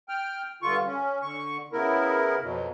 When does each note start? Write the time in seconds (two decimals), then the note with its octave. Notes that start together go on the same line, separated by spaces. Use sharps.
0.09 G5 F6
0.62 G2 D3 F4 C#6
0.86 C#4
1.22 D3 C#6
1.73 C#3 B3 E4 A#4
2.41 F2 B2 F#3